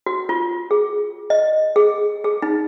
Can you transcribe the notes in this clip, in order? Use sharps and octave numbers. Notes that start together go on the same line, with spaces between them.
F#4
F4
G#4
D#5
G#4
G#4
D#4